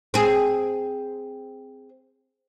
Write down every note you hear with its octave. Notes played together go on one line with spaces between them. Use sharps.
C4 G#4